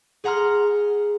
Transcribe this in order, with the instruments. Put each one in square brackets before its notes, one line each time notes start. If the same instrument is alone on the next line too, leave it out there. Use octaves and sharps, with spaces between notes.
[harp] G#4 F#5 A#5 C6 F6